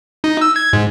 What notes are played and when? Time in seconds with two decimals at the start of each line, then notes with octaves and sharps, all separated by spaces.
0.24 D#4
0.41 E6
0.56 G#6
0.73 G#2